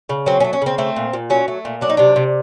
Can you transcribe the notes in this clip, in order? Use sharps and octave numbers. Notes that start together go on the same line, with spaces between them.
C#3
F#3 C4
C#4
A3
C#4
C#3 C4
A3 C4
A#2
A#2
F#3 C#4
A3
A#2
F#3 D4
D#4
C3 D4
C3